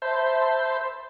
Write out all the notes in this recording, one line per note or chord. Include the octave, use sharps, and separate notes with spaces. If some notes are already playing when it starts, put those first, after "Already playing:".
C5 E5 A5 B5 C6 G6